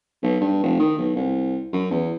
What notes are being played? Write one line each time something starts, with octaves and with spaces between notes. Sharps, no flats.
B1
G2
F1
D#3
B1
C2
F#2
E2